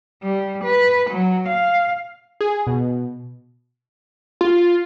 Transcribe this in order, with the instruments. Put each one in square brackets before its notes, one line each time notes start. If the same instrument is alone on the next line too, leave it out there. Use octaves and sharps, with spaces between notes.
[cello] G3
B4
F#3
F5
[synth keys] G#4
B2
[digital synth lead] F4